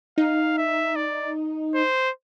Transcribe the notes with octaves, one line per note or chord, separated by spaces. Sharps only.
D#4 F5
E5
D5
C5